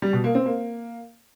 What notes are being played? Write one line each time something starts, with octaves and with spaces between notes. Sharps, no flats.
G3
B2
A#3
C4
A#3